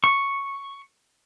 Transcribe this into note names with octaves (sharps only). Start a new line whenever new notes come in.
C#6